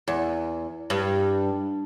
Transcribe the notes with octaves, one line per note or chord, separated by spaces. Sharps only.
E2
G2